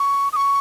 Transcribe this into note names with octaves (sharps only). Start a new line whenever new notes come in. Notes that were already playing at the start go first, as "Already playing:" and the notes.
Already playing: C#6
D#6
C#6